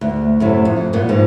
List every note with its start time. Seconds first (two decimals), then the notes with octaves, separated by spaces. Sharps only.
0.01 D2
0.40 F#2 A2 C3
0.65 F2
0.93 G2 A#2 B3
1.09 G#2 F3